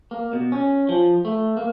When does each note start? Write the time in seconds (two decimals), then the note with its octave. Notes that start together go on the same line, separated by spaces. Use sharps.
0.11 A#3
0.33 B2
0.52 C#4
0.89 F3
1.25 A3
1.57 A#3